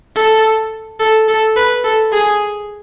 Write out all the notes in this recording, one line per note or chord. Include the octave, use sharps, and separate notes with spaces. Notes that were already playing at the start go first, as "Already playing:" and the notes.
A4
A4
A4
B4
A4
G#4